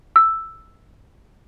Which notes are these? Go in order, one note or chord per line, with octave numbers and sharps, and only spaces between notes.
E6